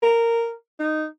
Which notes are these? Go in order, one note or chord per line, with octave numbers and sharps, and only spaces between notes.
A#4
D#4